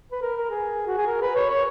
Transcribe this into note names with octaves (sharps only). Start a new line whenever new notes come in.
B4
A#4
A#4
G#4
F#4
G#4
A#4
B4
C#5
C#5